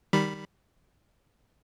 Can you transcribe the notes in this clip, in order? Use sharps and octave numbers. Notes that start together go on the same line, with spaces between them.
D#3 G3 B5